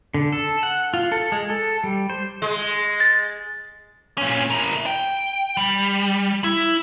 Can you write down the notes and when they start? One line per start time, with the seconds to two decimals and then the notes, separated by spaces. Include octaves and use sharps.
0.14 D3
0.33 A4
0.63 F#5
0.94 F4
1.12 A4
1.32 G#3
1.50 A4
1.84 G3
2.10 C5
2.42 G#3
3.00 A6
4.18 A#2 C#4
4.51 E4 A#4
4.86 G5
5.57 G3
6.44 E4